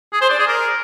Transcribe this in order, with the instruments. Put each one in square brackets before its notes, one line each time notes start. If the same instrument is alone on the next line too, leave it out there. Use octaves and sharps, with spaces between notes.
[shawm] G#4
C5
D5
G#4
A#4